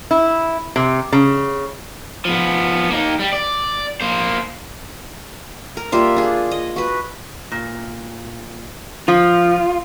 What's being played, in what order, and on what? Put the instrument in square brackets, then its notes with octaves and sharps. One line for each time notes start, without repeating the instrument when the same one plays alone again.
[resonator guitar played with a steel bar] E4
C3
C#3
[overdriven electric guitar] F3 B3
A#3 D#4
G3
D5
A#3 C5
[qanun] A#4
G3 A#3 F4 E5
D4 G#4
D#5
F#4 B4
[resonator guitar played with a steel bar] A#2
[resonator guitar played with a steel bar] F3 [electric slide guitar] F4